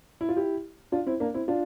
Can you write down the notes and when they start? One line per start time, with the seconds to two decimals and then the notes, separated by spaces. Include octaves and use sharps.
0.21 E4
0.29 F4
0.36 E4 G4
0.92 D4 F4
1.06 C4 E4
1.20 A#3 D4
1.34 C4 E4
1.48 D4 F4